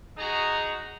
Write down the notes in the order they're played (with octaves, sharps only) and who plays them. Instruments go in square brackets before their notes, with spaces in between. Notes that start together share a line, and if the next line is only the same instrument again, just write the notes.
[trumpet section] D#4 F#4 G#4 A#5